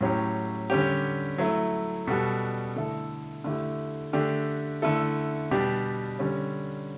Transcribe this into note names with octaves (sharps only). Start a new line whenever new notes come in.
A2 F#3 C#4 G4
D3 G3 C#4 G4
F#3 A3 E4
B2 G3 B3 F#4 A4
D3 A3 E4 A4
D3 A3 E4 G4
D3 A3 D4 G4
D3 A3 E4 A4
B2 G3 D4 G4
D3 G3 C#4